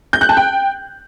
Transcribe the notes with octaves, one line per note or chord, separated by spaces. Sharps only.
G6
F#6
A5
G5